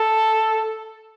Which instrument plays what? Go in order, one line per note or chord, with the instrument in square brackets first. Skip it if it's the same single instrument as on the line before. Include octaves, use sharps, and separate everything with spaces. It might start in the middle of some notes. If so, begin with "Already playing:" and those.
Already playing: [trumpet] A4